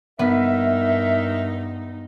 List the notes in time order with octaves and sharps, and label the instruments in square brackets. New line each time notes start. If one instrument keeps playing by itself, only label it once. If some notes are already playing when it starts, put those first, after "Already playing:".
[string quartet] G2 D#4 [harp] B3 [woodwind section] A#4 E5